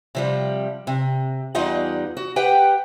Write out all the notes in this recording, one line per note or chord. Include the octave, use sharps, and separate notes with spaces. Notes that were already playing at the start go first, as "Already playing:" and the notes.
C3 F3 G3
C3
E2 G3 D#4 F4 D#5 F#5
F#4
G4 B4 F#5 G5